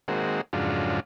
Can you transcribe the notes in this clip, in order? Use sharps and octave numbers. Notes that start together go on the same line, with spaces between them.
D#3 G#3 A#3 C4 F#4
F2 G#2 C#3 F#3 D4 F4